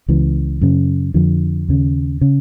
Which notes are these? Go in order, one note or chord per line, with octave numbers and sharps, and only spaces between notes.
C#2 C#3 E3
F#2 C#3
F2 D3 F3
D#2 C#3
C#3